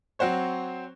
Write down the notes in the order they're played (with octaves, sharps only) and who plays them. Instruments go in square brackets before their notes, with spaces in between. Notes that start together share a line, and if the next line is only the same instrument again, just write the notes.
[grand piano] F#3 C4 F#4 C5 C#5